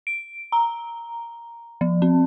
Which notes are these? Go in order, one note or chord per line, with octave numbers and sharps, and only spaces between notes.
D7
A#5
F3
C4